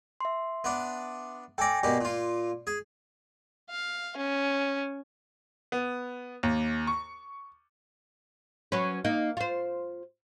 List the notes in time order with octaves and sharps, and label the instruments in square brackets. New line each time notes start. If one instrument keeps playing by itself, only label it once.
[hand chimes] E5 C6
[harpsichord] B3 D4
[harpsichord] A4 D5 [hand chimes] G5 G#5 A#6
[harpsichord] B2 A#3 G4 [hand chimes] D5
[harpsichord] A#2 F4
G#4
[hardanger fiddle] F5
C#4
[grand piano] B3
D#2
C#6
[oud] F#3 C#4 B4
A#3 D#4
F4 C5